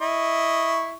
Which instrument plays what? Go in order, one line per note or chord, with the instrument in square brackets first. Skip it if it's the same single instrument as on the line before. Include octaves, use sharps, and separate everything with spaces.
[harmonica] E4 D#5 C#6